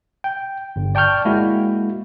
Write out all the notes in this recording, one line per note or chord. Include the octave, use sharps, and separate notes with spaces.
G5
G1
D5 G5 A5 C#6 F6 G6
G#3 A#3 E4 F#4